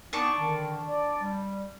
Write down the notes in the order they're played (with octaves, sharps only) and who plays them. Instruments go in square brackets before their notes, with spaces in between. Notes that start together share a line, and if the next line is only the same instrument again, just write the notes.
[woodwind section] B3 D#4 [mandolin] D4 A5 C#6
[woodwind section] D3 D#3
D5
G3